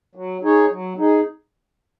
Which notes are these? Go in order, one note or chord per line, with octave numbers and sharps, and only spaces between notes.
F#3
D#4 G#4 C#5
F#3
D#4 G#4